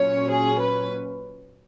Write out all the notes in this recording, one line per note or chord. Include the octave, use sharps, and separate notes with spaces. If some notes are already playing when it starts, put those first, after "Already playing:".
Already playing: A#2 F#3 C#4 C#5
G#4
B4